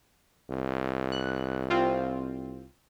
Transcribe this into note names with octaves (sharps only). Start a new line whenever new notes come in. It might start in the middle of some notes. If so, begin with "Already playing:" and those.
C2
F#6
C4 F4